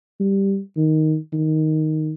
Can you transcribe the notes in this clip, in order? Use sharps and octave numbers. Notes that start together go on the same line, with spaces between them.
G3
D#3
D#3